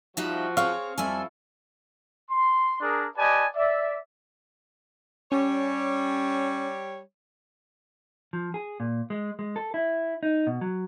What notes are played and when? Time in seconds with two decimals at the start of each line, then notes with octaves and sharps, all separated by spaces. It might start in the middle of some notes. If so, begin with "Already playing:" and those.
0.17 F3 G3 D#4 F#4 E5
0.57 C4 G#4 C#5 F5 C#6
0.98 F2 F3 G3 E4 A4 G#5
2.31 C6
2.81 D4 G#4 A#4
3.17 G4 B4 D5 D#5 G#5 A5
3.56 D5 E5
5.32 G3 C#4 C#5
8.33 F3
8.54 G#4
8.80 A#2
9.10 G#3
9.39 G#3
9.56 A4
9.74 E4
10.23 D#4
10.47 B2
10.61 F#3